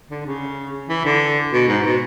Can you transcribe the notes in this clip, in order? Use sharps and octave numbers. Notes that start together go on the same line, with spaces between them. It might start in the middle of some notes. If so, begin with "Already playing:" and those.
D3
C#3
E3
D3
B2
G#2
B2